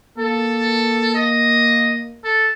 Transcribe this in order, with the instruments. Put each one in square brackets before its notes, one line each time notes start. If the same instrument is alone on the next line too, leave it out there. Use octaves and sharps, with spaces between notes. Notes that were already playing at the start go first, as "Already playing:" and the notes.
[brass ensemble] A#3 [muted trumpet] A4
[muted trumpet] D#5
A4